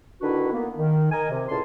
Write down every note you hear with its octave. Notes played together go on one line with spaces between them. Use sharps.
D3 D#3 D4 E4 F#4 B4
A#3 B3
D#3
A#4 D#5 G#5
C3
C#2 A2 C#4 A5 C6